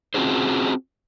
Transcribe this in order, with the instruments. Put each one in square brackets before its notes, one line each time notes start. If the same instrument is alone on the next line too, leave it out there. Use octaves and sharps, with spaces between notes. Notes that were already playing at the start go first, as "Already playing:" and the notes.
[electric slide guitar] C4 C#4 F4 F#4 G#4 C5